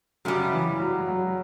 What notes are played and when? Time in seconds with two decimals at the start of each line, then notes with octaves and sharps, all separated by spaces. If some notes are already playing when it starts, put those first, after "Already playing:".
0.25 F#2 C#3 F#3 G3
0.53 E3
0.80 F#3
1.08 F#3